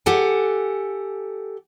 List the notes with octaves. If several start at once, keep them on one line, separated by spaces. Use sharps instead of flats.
G4 A4 F#5 G#5